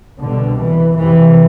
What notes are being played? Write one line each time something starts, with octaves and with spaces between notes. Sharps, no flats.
C2 B2 D3
E3
F2 C3 E3